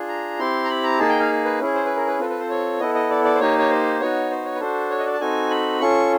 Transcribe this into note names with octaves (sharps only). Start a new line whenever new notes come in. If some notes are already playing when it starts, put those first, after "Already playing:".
Already playing: D4 F4 G#4
A#5
C4 E4 G4 C6
A#5
B5
A#5
A#3 D#4 G#4 A5
G5
F5
B4
C#4 E4 G#4
C5
B4
A#4
B4
C4 F4 A4 B4
B4
C5
C#5
B3 E4 A4 D#5
D#5
D5
D5
C5
A#3 D#4 G4 C#5
C#5
C5
B3 D#4 F#4 C#5
C5
C#5
B4
D4 F#4 A4 C5
C#5
D#5
D5
A5
C4 D#4 F#4 A4 G#5
B5
C#4 F4 A4 C#6